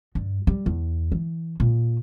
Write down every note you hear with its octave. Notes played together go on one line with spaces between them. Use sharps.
G2
G3
E2
E3
A#2